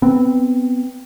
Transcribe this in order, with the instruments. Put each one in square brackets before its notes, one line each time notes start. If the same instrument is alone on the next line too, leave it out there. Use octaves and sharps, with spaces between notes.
[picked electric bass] B3 C4